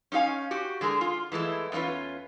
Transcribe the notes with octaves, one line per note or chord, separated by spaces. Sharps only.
C#4 D#4 F#4 F5 G#5
F#4 G4
D3 G#3 G#4 A#4
F4
E3 G#3 A3 E4
E2 C#4 E4 F4 B4